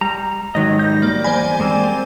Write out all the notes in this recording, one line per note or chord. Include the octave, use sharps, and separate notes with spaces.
G3 A#5
G#2 D#3 F#3 C#5 D#5
G3 G6 A#6
A#3 D5
E2 C5 D5 G#5 B5
G#3 A#3 C4